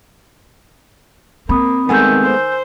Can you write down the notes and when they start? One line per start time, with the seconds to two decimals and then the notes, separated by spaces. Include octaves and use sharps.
1.49 A#3 C4 B5 D#6
1.89 D#3 G#3 A3 B3 G#5 E6 G6
2.24 C5